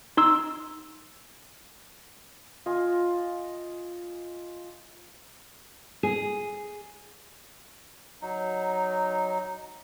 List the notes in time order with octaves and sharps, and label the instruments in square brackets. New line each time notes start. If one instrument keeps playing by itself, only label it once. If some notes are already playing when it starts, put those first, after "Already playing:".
[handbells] D#4 C6 E6
[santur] F4 D#5 G#5
[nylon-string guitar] G#4
[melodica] F#3 D#4